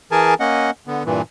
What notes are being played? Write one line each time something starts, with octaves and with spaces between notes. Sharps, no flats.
E3 G#4 A#4 G#5 A5
A#3 C#4 D#5 F#5
D3 B3
G2 A#2 E3